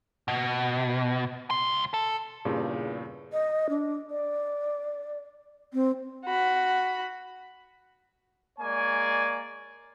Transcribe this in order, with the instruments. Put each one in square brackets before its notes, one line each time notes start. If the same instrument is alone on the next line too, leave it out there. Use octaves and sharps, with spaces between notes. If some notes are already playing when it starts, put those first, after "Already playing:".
[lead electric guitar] B2
C#2 C6
A4
[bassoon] E2 [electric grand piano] G2 A#2 C#3
[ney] D#5
D4
D5
C4
[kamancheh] F#4 B5
[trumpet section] G#3 A#3 C#5 D5 G#5